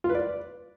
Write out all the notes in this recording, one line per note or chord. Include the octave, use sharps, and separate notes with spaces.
F4
B4
D5